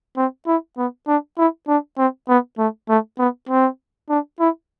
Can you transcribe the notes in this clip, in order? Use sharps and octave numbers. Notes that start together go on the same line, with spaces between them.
C4
E4
B3
D4
E4
D4
C4
B3
A3
A3
B3
C4
D4
E4